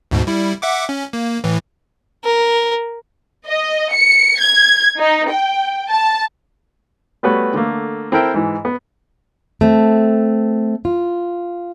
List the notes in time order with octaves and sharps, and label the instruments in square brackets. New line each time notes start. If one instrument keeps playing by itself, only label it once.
[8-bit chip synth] D2 G#2 B2
G3 E4
E5 F#5 D6
C#4
A#3
A2 E3
[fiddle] A#4
[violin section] D#5
C#7
G#6
D#4
G5
A5
[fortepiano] G3 A3 B3 F#4 B4 C#5
D3 A3 A#3
C4 E4 A4 A#4 E5 G5
G#2 E3
B3
[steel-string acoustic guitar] A3 C4
F4